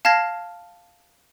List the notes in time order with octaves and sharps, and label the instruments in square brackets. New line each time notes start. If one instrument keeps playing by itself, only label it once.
[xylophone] F5 A5 F6 G#6 A#6 C7